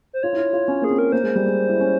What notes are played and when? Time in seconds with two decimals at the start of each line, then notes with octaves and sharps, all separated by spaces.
0.13 C5
0.23 F4 C#5
0.33 E4
0.38 F4
0.53 F4
0.68 C#4
0.82 A#3 G#4
0.91 C4
0.99 A#4
1.12 A#3 C5
1.23 G#3
1.35 G3
1.46 G#3
1.69 E4
1.80 C#4